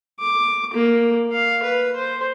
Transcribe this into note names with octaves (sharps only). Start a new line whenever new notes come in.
D6
A#3
F5
B4
C5